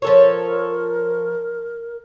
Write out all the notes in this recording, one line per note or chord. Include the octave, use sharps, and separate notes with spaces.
F3 A4 A#4 C#5